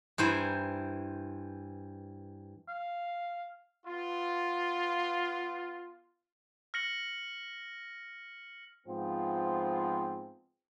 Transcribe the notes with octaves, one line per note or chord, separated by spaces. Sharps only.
G2 E3 C5 G#5 A#5
F5
B3 F4
F6 A#6 C#7 F#7
G#2 F3 B3 C4 F4